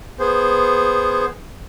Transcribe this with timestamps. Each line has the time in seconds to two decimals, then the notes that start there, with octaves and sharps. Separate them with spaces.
0.19 B3 G#4 C5